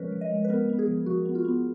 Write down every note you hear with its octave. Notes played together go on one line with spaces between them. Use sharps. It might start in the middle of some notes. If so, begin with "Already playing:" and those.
Already playing: F3 G#3 C#4 A#4 B4 C#5
F3
D#5
G#3
B4
B3 A#4
B3
G#4
F3
F3 F#4
B3
F4
B3